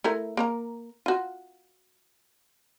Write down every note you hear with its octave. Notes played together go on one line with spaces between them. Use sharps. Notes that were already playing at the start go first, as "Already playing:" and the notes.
A3 E4 A#4
A#3 A#4 A#5
F4 F#4